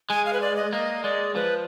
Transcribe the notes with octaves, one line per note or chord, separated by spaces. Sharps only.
G#3 G#5
F5
B4
D5
D#5
A#3 D#5
G#3 D5
F3 B4